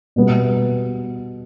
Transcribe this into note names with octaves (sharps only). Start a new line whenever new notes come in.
B2 G3 B3